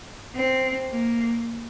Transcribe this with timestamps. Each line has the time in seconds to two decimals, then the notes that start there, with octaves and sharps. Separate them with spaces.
0.35 C4
0.91 A#3